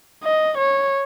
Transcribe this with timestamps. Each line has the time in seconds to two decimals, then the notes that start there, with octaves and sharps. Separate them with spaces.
0.23 D#5
0.58 C#5